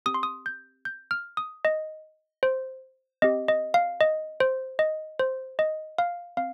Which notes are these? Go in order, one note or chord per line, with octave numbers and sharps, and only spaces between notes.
C4 G4 D#6
C6
D#6
G6
G6
F6
D#6
D#5
C5
C4 G4 D#5
D#5
F5
D#5
C5
D#5
C5
D#5
F5
C4 F5